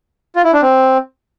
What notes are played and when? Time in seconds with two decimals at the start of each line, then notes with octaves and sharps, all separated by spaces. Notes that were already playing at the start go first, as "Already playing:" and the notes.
0.36 F4
0.44 E4
0.53 D4
0.62 C4